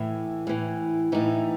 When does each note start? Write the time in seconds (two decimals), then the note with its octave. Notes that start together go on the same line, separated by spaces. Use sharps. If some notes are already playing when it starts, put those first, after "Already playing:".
Already playing: A2 E3
0.47 A2 E3
1.12 A2 E3 D#4